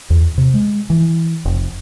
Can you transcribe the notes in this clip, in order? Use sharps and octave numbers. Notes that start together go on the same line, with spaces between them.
E2
C3
G#3
E3
F1